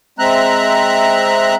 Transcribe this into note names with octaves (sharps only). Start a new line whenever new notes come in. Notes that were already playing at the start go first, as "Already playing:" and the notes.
G#3 C4 E5 A#5 F#6